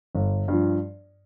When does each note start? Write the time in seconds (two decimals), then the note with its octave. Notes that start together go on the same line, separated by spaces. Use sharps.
0.15 G1
0.48 G2 F3